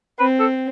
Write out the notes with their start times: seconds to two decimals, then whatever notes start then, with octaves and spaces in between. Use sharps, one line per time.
0.19 C4 B4
0.40 A4